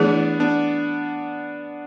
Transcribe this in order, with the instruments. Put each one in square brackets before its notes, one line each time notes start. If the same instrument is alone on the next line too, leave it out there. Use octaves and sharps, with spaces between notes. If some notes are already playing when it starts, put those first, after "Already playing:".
Already playing: [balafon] E3 A3 E4 G#4 [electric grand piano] B3 D4
[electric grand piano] B3 D4